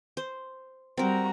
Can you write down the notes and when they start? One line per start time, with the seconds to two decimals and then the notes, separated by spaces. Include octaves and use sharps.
0.17 C5
0.98 G3 C4 F#4 A#4 A#5